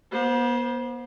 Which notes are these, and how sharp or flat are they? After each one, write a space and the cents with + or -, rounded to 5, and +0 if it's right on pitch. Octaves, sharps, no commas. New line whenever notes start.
B3 -40 C5 +0